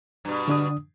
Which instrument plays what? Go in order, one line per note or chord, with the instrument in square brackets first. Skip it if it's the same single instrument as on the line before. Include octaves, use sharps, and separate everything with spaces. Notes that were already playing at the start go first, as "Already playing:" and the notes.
[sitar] G2 B2
[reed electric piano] D3 D4 D#6